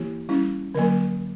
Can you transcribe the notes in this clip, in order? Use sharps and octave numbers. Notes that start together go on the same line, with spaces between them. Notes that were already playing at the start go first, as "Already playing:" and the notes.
Already playing: E3 A#3 E4 G4
G3 C#4 E4
D3 F#3 A#3 A#4